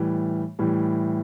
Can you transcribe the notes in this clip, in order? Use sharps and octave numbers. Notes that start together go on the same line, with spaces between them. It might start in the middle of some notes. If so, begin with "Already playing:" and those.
Already playing: A2 E3 G3
A2 E3 G3